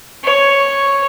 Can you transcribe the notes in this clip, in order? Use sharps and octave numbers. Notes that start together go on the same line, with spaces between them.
C#5